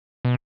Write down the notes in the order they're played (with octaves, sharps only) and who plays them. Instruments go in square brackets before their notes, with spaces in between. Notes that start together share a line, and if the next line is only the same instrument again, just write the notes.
[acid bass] B2